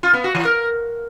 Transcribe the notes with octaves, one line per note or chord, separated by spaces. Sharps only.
F4
B3
F#4
E3
A#4